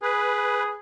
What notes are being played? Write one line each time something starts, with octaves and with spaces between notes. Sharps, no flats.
G#4 B4